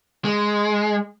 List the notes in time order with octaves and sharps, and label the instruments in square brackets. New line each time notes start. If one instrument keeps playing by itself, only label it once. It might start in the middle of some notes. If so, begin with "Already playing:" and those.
[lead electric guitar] G#3